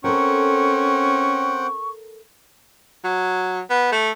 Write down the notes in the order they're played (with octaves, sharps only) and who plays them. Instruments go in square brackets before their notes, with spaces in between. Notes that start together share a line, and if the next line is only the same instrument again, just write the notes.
[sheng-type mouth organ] C4 F#5 G5 [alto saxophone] C#4 [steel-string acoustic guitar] A4 A#4 [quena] C#6
[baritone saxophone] F#3
B3
A3